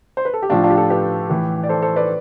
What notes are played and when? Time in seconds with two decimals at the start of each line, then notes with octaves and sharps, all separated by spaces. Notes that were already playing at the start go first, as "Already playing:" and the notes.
0.17 C5
0.25 B4
0.34 A4
0.42 G4
0.49 A2 F3 D4 F4
0.64 D4 F4
0.70 G4
0.76 F4 A4
0.90 G4 B4
1.30 A2 E3
1.64 D5
1.69 A4 C5
1.82 A4 C5
1.96 B4 D5